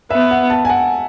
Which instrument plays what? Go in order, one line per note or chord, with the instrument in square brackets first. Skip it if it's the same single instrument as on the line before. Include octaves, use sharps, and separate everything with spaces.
[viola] B3 [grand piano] E5
[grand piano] F#5
A5
G#5
F#5